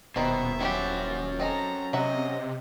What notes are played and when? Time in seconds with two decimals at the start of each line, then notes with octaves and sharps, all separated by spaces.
0.16 D#1 B2 D#3 C5 E5
0.61 C4 C#4 E4 F#4 G4
1.40 C4 A4 D#5 G#5 A#5
1.93 C3 F#3 D#5 E5 F#5